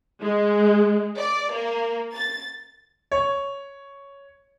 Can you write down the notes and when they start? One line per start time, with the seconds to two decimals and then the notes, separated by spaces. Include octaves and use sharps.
0.21 G#3
1.18 D5
1.51 A#3
2.15 A6
3.11 C#5